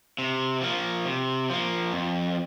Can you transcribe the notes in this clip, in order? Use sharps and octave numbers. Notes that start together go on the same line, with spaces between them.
C3
F3 A#3
C3
F3 A#3
F2